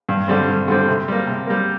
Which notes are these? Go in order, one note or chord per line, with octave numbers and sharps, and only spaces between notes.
G2
D3 G3 C4
G2
D3 G3 C4
C3
G3 A#3
C3
G3 A#3